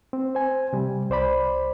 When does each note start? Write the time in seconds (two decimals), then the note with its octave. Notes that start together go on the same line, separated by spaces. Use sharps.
0.13 C4
0.35 C5 G#5
0.73 C3 G3
1.10 C2 C5 D5 B5